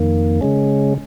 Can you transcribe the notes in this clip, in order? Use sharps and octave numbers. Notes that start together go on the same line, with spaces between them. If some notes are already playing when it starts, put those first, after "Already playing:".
Already playing: F2 D#3 A#3
C#3 G#3 C#4